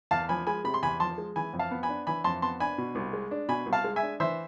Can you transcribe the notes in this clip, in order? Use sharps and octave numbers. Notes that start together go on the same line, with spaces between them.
E2 F5 A5
F3 G#5 B5
G#3 G#5 B5
C3 B5
C6
E2 G#5 B5
F3 A5 C6
G#3
E3 G#5 B5
F2
F5 A5
B3
G#5 B5
D4
E3 G#5 B5
F2 A5 C6
B3 A5 C6
D4 G#5 B5
B2
C2
G#3
D4
B2 G#5 B5
C2
F5 A5
G#3
E5 G#5
D4
E3 C5 E5